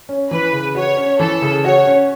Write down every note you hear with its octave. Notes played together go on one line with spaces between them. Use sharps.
C#4
E3 B4
C#3
F#4 C#5
C#4
E3 A4
C#3
F#4 C#5
C#4